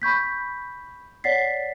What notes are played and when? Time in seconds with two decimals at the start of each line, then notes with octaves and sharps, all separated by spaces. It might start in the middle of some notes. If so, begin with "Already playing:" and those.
0.02 B5 C#6 G6 B6
1.24 C#5 D5 F#5 A6 B6 C7